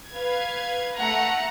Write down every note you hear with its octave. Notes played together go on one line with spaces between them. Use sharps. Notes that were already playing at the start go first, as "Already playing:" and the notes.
B4 F5 G#6
A3 F#5 A#5